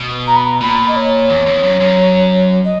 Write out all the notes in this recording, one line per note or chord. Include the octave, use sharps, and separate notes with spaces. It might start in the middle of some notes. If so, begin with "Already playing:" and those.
Already playing: B2
A#5
B5
A#5
A#2 B5
D#5
C#5
E2
E2
F#2
F#2
D#5